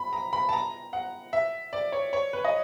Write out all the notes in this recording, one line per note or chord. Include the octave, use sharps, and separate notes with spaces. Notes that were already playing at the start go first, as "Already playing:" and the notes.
Already playing: B5
A#5
B5
A5
A#5
F#5
E5
D5
C#5
C#5
B4
D#5